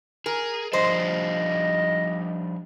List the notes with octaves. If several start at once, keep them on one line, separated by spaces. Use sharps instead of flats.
G#4 A#4
F3 G3 D4 C5 D#5